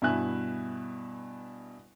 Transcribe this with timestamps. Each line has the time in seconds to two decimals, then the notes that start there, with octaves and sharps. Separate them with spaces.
0.02 G2 B2 E4 E5 G#5 F#6